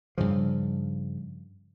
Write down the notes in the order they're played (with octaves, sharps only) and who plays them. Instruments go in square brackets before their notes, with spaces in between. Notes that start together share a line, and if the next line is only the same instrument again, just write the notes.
[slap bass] G2 C#3 F3